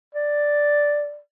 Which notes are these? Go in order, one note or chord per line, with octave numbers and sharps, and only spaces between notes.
D5